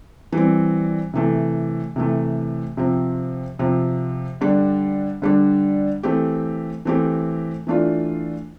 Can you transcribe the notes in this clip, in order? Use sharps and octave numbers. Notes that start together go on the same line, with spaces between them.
E3 G3 C4
C3 E3 A3
C3 E3 A3
C3 F3 C4
C3 F3 C4
D3 G3 D4
D3 G3 D4
E3 A3 C4 G4
E3 A3 C4 G4
E3 A3 D4 F4